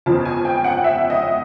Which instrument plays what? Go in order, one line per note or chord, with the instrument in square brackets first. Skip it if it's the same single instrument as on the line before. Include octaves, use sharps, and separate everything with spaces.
[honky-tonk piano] G1 F2 C#3 F3 A5
G#5
G5
F#5
E5
D#5